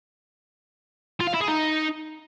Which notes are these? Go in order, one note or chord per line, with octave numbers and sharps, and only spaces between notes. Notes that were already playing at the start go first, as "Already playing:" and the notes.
F4
F5
E4
G#4
D#4